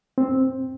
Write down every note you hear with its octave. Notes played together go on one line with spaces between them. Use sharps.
C4